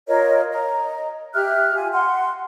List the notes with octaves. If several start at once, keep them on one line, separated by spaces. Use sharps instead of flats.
F4 A#4 C#5 D#5
D#5 A#5
G4 E5 F6 F#6
F4 G#5
F#5 C6